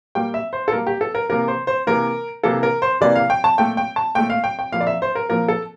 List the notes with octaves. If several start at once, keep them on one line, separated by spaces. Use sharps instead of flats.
A#2 G3 A#3 G5
E5
C5
A4
A#2 G3 A#3 A#4
G4
A4
A#4
C3 E3 A#3 A#4
C5
C5
C3 E3 A#3 A#4
C3 E3 A#3 A4
A#4
C5
C3 E3 A#3 D5
F5
G5
A5
A#2 A3 G5
G5
A5
A#2 A3 G5
F5
G5
G5
A#2 F3 A#3 F5
D5
E5
C5
A#4
A#2 F3 A#3 A#4
A4